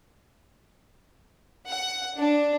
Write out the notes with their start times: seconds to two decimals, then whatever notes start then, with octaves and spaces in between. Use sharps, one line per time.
1.68 F#5
2.18 D4